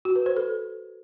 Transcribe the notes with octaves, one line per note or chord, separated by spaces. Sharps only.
F#4
B4
C5
A4